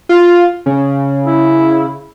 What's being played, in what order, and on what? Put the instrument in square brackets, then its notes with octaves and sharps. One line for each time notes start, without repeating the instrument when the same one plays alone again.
[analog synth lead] F4
C#3
[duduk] E4